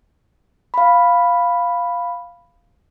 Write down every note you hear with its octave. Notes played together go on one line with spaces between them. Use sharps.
F5 B5